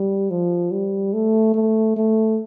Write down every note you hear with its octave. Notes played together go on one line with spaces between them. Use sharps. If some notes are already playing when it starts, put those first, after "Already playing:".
Already playing: G3
F3
G3
A3
A3
A3